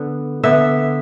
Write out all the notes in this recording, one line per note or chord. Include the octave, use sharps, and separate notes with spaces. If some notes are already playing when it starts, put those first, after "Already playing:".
Already playing: D3 B3
D3 B3 E5